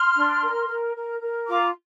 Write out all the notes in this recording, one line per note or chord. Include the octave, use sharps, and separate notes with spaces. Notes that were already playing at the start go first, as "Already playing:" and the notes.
Already playing: C6 F6
D4
A#4
A#4
A#4
A#4
F4 A#5 D6